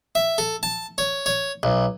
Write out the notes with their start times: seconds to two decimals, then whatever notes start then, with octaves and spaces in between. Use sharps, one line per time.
0.15 E5
0.38 A4
0.63 A5
0.98 C#5
1.26 C#5
1.63 B1